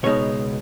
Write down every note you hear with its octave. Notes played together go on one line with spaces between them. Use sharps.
C#2 B2 G#3 D#4 C#5